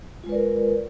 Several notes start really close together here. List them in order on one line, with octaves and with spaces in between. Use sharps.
F4 G#3 B4 D5 A#4